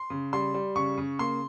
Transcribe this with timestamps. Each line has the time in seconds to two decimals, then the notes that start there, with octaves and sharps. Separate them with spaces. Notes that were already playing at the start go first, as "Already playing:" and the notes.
Already playing: C6
0.10 C#3
0.33 G3 C6
0.54 G3
0.76 C#3 C#6
0.98 C#3
1.19 A#3 C6